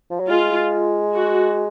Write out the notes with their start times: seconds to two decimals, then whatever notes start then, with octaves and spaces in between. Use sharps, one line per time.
0.11 F3
0.20 F#3
0.30 G#3 F4
1.13 F#4